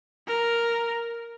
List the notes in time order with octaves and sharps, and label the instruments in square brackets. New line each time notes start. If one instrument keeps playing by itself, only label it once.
[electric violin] A#4